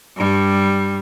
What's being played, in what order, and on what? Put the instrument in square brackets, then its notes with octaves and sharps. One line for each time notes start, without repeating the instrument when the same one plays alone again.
[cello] G2 G3